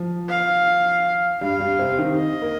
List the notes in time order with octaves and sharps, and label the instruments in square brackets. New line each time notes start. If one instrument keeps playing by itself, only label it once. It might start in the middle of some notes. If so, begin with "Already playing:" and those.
Already playing: [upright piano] F3
[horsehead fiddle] F5
[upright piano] G2 G3 [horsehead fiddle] F5
[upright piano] G2 G3
C3 C4
D#3 D#4
[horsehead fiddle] D#5
[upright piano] A#3 A#4